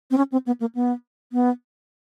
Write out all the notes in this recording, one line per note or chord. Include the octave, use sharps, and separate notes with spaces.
C4
C#4
C4
B3
A#3
B3
B3